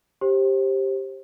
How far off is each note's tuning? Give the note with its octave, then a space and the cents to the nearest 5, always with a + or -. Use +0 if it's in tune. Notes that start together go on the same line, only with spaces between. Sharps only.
G4 +0 C5 +25